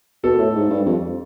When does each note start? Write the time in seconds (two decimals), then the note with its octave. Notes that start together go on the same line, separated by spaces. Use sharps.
0.24 B2 A4
0.38 A2
0.55 G#2
0.70 G2
0.86 F2